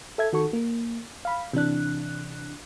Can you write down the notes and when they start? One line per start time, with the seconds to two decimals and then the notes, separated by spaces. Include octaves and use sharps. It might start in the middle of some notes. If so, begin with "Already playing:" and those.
0.18 A4 E5 G#6
0.33 D#3 F#4 A4 C#6
0.53 A#3
1.25 F5 B5
1.53 C3 E3 D4 F#6